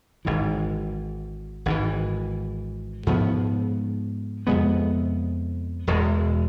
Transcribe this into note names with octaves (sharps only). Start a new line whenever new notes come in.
G#1 G#2 E3
G#1 G#2 E3
G#2 F3 B3
F2 C3 G#3 B3
E1 E2 B2 G#3